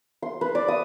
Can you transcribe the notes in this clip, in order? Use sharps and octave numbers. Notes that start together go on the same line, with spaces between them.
C6
B4
D5
D#6